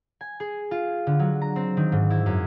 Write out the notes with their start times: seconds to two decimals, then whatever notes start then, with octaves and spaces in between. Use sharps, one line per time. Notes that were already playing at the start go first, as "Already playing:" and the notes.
0.21 G#5
0.40 G#4
0.71 F4
1.07 D3
1.19 F#3
1.42 A#5
1.56 C4
1.77 D#3
1.92 G#2
2.10 E4
2.26 F#2